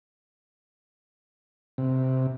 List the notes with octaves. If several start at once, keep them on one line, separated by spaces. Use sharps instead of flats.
C3